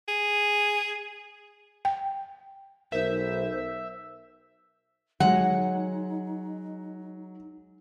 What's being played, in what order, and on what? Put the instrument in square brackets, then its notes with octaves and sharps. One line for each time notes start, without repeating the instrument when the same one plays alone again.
[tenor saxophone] G#4
[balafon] G5
[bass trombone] B1 [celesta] D#4 A#4 [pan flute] C5 [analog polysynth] E5
[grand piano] F#3 [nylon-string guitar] G#3 [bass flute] D#4 [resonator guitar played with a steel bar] F#5